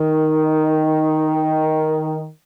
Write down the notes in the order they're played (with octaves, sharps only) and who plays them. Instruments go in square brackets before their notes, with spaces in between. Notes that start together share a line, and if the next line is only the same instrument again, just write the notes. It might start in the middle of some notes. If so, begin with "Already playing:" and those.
Already playing: [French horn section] D#3